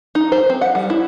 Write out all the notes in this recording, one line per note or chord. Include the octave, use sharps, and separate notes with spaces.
D#4
C5
C4
F#5
G3
E4